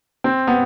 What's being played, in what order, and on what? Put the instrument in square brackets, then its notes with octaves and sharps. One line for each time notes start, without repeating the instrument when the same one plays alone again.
[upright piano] C4
B3